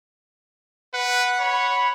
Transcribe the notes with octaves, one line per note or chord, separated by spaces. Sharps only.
B4 F#5
C#5 B5